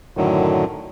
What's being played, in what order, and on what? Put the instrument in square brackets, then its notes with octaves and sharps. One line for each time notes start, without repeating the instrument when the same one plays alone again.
[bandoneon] F#2 A2 D3 D#3 F#3